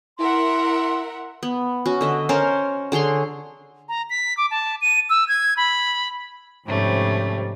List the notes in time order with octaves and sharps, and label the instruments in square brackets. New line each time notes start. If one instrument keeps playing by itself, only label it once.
[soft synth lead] E4 [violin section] A#4 E5 F#5 [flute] C6
[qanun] B3
C#4 F#4
D3 D#5 E5
C#4 A#4 C5 C#5
D3 G#4 C#5 C6
[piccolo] A#5
B6
D6
A5
D#7
E6
G#6
B5
[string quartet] F2 G#2 C3 G3 A3 C#4